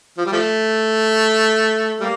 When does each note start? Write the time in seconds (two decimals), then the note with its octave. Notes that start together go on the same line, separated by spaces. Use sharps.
0.18 F3
0.26 G3
0.32 F3 A3
2.00 G3 A#3